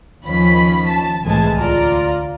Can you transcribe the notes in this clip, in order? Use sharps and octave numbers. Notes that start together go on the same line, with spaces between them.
D#2 D#3 F3 C#4 B5 B6
A5
C2 A2 E3 G#3 G#5 A5
D2 F4 D5 A#5